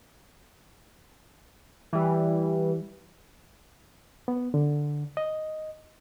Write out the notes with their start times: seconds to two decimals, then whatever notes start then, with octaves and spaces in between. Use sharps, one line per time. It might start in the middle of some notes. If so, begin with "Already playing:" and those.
1.93 E3 G3
4.28 B3
4.54 D3
5.17 D#5